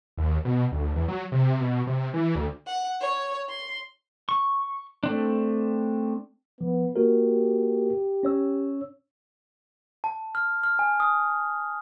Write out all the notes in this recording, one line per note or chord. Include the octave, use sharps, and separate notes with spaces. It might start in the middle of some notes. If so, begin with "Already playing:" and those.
D#2
B2
D2
E2
F#3
C3
B2
C3
E3
D2
F#5
C#5
C6
C#6
A3 C4 D4
F3 B3
A#3 F#4 G4 A#4
C#4 C#5 E6
A5
F6
F6
G#5
D#6